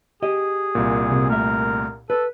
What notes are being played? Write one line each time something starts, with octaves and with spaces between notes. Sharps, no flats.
G4 G#4 D#5
C2 A#2
C3
A3 A#4 E5
A4 B4